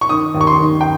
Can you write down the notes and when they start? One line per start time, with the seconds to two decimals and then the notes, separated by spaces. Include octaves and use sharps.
0.01 C#6
0.09 D#3 D#6
0.35 D#2
0.41 C#6
0.47 C6
0.59 D#3
0.81 G5